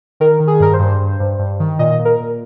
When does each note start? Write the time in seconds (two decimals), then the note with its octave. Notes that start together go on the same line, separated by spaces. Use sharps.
0.20 D#3 A#4
0.40 D#3
0.47 G#4
0.60 G2 A#4
0.73 C5
0.79 G2
1.00 G2
1.20 G2
1.39 G2
1.60 D#3
1.79 A#2 D#5
1.99 A#2
2.05 A#4
2.20 A#2